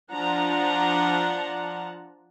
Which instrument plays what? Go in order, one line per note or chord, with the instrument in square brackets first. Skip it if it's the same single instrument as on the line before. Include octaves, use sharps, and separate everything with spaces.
[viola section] F3 D4 F#5 A5 A#5